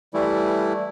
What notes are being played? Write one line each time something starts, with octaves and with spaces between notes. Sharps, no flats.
E3 G3 A3 E4